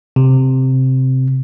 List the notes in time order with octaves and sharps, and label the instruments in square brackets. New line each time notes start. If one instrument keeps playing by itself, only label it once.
[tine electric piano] C3